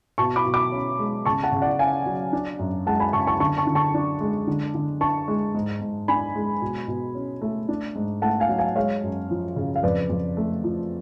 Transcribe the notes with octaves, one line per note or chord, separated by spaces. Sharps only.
B2 A5 C#6
B5 D6
B2
B5 D6
C#4
G#3
C#3 A5 C#6
F#5 A5
C#3
D5 F#5
C#4 F5 G#5
F#3
D4
F#2
G#3 F#5 A5
G#5 B5
C#3 A5 C#6
A5 C#6
D3 A5 C#6
A5 C#6
D3
A5 C#6
D4
G#3
D3
D3
D4 A5 C#6
G#3
G#2
G#2
D4 G#5 B5
G#3
B2
B2
C#4
A3
D4
G#2
A3 F#5 A5
F5 G#5
F#3
F5 G#5
G#3 C#5 F5
F#2
F3
C#3
F5
F2 B4 D5
F2
A3
F3